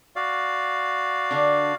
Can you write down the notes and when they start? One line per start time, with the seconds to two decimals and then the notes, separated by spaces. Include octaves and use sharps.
0.16 F#4 D5 F5
1.31 D3 D4